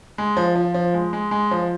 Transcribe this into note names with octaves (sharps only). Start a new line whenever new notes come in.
G#3
F3
F3
F3
G#3
G#3
G#3
F3